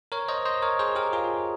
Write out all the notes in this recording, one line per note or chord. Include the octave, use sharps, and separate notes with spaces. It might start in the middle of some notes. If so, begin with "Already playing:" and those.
A#4 C#5
C5 D#5
C5 D#5
A#4 C#5
G#4 C5
G4 A#4
F4 G#4